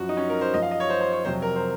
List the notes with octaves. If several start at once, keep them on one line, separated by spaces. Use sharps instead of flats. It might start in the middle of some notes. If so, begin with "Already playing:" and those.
Already playing: F#2 F3 F#4
D#4
C#4
A#4
C5
F#2 F3 D#5
F5
D#5
C#5
C5
C5
C#5
F2 C3 F#3 C5
A#4
C5